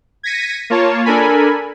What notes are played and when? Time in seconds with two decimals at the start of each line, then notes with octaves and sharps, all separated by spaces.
0.23 G#6 A#6 B6 C#7 D#7
0.70 A#3 F4 C#5 A5
1.05 D4 A4 A#4 G#5 B5